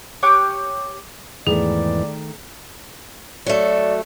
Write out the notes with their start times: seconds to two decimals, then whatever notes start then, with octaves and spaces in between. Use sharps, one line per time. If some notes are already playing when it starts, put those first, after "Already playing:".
0.23 G4 C#5 D6 F#6
1.47 E2 G#2 D#3 E3 A3 G#4 D5
3.46 F#3 A3 D5